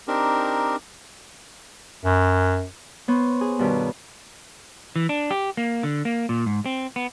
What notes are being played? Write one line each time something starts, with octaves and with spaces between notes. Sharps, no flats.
C4 D4 D#4 G4 A#4
F#2
B3 C5 C#5
G#4
G2 B2 D#3
E3
D4
G4
A#3
D3
A#3
A#2
G#2
C4
B3